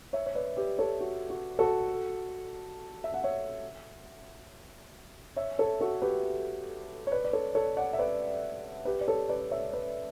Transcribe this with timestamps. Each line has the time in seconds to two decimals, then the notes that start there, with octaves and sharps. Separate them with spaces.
0.13 C#5 E5
0.26 C#5
0.35 B4 D5
0.57 G4 B4
0.79 A4 C#5
1.01 F#4
1.30 F#4
1.59 F#4 A4
3.04 E5
3.14 F#5
3.24 C#5 E5
5.36 C#5 E5
5.59 A4 C#5
5.81 F#4 A4
6.02 G4 B4
7.07 C#5
7.12 B4 D5
7.24 D5
7.33 A4 C#5
7.55 A4 C#5
7.77 D5 F#5
7.93 E5
7.99 B4 D5
8.85 G4 B4
9.01 D5
9.08 A4 C#5
9.29 B4 D5
9.51 C#5 E5
9.73 B4 D5